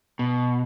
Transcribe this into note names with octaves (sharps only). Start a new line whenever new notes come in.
B2